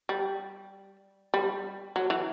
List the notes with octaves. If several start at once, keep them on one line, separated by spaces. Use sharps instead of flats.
G3
G3
F#3
E3